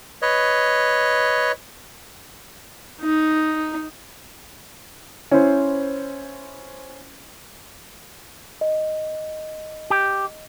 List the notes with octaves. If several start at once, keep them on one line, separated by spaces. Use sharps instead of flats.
B4 C#5 D#5
D#4
C#4 E4 C5
D#5
G4